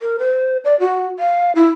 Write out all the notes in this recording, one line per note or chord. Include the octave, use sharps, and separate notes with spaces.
A#4
C5
D5
F#4
F5
E4